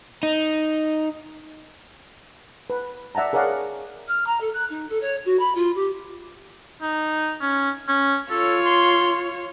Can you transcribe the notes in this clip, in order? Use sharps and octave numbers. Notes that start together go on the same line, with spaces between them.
D#4
B4
D5 E5 F#5 A5 A#5
G#4 A#4 C#5 D5 F5 F#5
F6
A#5
A4
F#6
D#4
A4
C#5
F#4
B5
F4
G4
D#4
C#4
C#4
F4 A4 C#5
C6